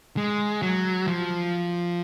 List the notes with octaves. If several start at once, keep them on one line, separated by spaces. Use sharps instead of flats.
G#3
F#3
F3